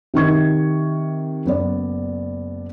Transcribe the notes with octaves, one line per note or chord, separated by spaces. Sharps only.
C3 D#3 C#6 G#6
F#1 B3 D5